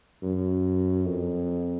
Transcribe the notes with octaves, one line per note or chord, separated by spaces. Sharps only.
F#2
F2